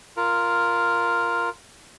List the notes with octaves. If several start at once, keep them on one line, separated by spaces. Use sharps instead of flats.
F4 A#4